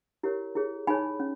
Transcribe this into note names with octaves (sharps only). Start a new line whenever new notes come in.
E4 G4 A#4 C#5
E4 G#4 C#5
D#4 G#4 C#5 G#5 B5
C#4